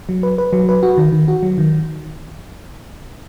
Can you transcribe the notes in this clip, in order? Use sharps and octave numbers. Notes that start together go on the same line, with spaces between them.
F#3
B4
B4
F#3
B4
F#4
D#3
D#3
F#4
F#3
D#3